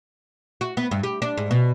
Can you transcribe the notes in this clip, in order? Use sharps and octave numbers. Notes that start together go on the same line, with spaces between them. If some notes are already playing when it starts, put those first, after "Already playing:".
F#4
B3
G2
G4
D4
G#2
B2